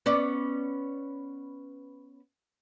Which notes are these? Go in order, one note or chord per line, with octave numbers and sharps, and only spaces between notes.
B3 C#4 D5